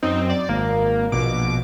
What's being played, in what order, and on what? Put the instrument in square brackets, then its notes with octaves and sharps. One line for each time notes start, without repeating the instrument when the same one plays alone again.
[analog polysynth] F#2 C4 [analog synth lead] D#4
[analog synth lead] D5
[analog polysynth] G#1 [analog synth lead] A#3
[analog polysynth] A#1 B2 [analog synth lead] D6